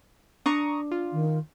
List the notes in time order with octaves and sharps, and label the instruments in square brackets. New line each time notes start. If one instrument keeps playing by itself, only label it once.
[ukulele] D4 [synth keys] A#5 C#6 D#6
[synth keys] F4
[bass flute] D#3